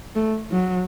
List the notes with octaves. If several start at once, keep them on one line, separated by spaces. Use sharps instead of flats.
A3
F#3